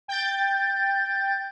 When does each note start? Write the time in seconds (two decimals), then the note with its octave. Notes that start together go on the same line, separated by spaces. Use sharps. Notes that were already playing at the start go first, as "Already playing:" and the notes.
0.08 G5 G6 A6